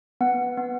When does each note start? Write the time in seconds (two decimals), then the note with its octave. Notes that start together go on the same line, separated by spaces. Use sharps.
0.21 B3 F#5
0.57 B3